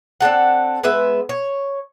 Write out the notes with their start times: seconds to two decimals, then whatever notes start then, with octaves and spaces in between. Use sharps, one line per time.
0.20 C4 D4 A4 F#5
0.83 G#3 B3 B4 E5
1.29 C#5